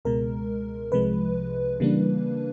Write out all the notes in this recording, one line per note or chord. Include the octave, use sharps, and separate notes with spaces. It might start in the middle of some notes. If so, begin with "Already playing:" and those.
C#2 B2 G#3 A#4
C2 C3 F3 G#3 B4
C#3 E3 G3 A#3 D4